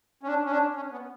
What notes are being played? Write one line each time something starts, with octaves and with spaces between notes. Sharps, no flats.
C#4
D4
C#4
D4
C#4
B3